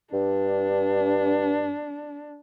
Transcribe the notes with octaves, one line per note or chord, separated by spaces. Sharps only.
G2 D4